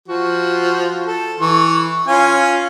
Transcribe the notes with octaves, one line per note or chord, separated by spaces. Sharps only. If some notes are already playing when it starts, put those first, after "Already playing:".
F3 F#4
A4
E3 C#6
C#4 F4 G#5